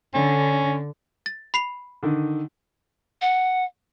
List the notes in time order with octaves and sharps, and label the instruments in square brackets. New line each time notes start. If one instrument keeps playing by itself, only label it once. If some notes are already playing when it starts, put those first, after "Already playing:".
[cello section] D3 [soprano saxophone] C#4
[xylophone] A6
B5 C7 F7
[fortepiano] D3 D#3
[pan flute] F#5